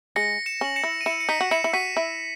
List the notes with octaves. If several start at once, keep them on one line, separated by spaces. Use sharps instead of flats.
G#3 A#6 C#7
C#7 E7
C#4 F#7
C#7 E7
E4
D#7
E4 C#7 E7
C#7
D#4 B6 D#7
F#4
E4 C#7 E7
E4 C#7
F#4 B6 D#7
E4